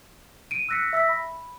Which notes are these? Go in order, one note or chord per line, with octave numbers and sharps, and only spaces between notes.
D7 D#7
E6 F#6 A#6 B6 C#7
E5 E6 A#6 B6
B5